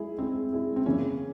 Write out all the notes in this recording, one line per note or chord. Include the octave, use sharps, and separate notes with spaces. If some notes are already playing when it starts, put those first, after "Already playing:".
Already playing: G#3 E4 G#4
G#3 C4 E4 G#4
G#3 E4 G#4
C4
C#3 E3 A#3 C#4